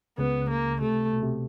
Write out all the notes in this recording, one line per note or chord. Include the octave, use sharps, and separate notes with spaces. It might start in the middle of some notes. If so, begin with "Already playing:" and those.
C#2 C#3 B3
A#3
C3 A3
B2
C3